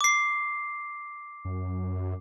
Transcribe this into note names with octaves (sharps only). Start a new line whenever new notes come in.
D6 C7
F#2